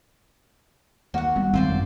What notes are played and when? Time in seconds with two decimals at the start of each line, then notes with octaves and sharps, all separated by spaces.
1.14 D#2 A#3 F#4 F#5
1.36 G3 B3
1.54 G#1 C4 F4 C5 D5
1.70 F#2